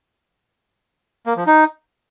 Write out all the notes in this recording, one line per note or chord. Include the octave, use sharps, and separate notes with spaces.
A#3
F3
D#4